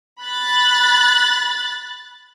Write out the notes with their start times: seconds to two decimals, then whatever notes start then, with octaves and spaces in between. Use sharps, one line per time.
0.23 B5 F#6 A6